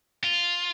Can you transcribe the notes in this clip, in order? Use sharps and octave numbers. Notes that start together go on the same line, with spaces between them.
F4